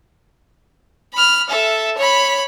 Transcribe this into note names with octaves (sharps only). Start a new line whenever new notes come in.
B5 F6
A4 E5
C#5 B5